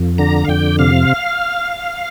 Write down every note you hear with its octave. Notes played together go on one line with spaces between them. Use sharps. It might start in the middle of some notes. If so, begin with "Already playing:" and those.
Already playing: F2
D3 A#5
F5
F2 G5
C3 F5